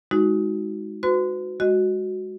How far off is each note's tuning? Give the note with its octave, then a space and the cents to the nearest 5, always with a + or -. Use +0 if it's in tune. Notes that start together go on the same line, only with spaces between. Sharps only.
G#3 +0 D#4 +25 F#4 +0
F#4 -15 B4 +40 C6 -35
G#3 -10 F#4 +0 D#5 +0